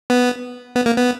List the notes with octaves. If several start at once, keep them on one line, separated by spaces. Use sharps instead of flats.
B3
B3
A#3
B3